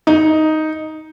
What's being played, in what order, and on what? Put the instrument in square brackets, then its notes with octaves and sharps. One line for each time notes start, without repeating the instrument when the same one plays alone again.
[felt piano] D#4